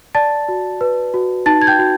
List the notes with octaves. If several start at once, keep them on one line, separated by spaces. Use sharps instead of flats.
D5 A5 A6
F#4
B4
F#4
D#4 A5 A6
G#6
G5 G6
F#4